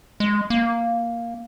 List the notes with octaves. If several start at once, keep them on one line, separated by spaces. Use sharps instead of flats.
G#3
A#3